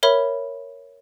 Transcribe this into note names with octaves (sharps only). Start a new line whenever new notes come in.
A#4 C#5 E5 B5